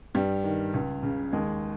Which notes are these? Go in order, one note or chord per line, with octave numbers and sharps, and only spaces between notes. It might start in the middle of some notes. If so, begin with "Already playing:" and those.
G2 G3
D#3
C#2
C#3
D#2 G#3